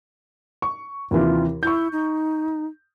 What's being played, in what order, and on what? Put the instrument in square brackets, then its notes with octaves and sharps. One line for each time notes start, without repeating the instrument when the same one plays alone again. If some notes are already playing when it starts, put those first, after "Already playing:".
[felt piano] C#6
[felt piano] D#2 C3 E3 [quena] F4
[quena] E4 [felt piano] C#6 G6
[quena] D#4